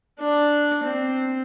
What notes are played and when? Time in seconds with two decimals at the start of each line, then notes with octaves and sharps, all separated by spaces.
0.20 D4
0.84 C4